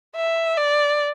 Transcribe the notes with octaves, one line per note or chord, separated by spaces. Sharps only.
E5
D5